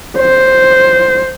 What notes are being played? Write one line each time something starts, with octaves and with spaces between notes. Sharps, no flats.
C5